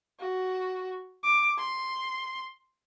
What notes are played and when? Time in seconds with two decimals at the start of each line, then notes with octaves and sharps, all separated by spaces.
0.20 F#4
1.23 D6
1.58 C6